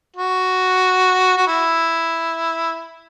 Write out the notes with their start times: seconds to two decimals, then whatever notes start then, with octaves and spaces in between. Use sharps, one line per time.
0.16 F#4
1.37 F#4
1.47 E4